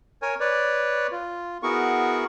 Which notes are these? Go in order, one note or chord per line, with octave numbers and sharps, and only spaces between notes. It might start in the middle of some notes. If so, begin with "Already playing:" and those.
A#4 C#5 G#5
B4 C#5 D5
F4
B3 E4 F#4 G#4 A#4 C#6